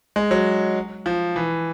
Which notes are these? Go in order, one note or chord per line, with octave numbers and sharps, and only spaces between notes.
G#3
F#3
F3
E3